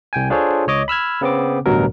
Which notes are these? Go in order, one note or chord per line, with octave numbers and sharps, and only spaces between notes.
C2 G5 G#5
D4 F4 G#4 A4 C5 C#5
C#2 C#5 D#5 D6
B5 E6 F6 G#6
C#3 B3 C4 D6
A1 D2 G2 B2 F#3 A#4